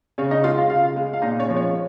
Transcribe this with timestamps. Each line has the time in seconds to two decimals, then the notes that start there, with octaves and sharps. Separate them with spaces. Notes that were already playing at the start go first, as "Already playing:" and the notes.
0.18 C#3 C#4 C#5
0.31 D#4 D#5
0.44 G#3 F4 F5
0.58 F4 F5
0.70 C#3 F4 F5
0.96 G#3
1.13 F5
1.22 A#2 D#4 D#5
1.39 C#4 C#5
1.49 F3 G#3
1.56 C#4 C#5